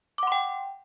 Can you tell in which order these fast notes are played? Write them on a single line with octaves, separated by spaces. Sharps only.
D6 F#5 C6 G5